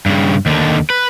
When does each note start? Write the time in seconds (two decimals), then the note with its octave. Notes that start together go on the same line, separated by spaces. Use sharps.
0.06 G2 C#3
0.46 D#2 D3
0.90 B4